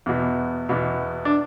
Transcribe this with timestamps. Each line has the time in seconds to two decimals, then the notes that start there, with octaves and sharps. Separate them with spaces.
0.06 E2 B2
0.69 E2 B2
1.25 D4